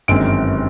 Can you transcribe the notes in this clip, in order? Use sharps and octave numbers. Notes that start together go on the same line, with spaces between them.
G1 F#2 D#3 G#3 C4 D7